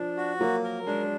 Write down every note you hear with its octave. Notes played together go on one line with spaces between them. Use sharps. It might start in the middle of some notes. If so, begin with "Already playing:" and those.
Already playing: F3 D4
F#4
F#3 A#3
A#4
G#3 D4